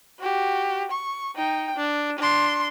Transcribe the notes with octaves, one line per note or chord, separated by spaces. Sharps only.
F#4 G4
C#6
D#4 G5
D4
D4 C6